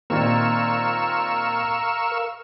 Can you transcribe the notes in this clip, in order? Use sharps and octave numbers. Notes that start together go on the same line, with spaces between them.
A#2 D#3 C4 A#4 F5 C#6 E6